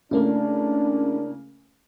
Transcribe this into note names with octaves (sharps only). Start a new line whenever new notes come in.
C#3 A3 A#3 C#4 D4 E4